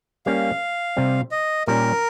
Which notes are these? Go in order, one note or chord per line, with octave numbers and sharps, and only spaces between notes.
G3 A#3 C#4 F5
C3 G3 C4
D#5
A#2 G3 C#4 G4 A#4